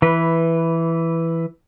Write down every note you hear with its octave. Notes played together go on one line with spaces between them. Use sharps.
E3 B4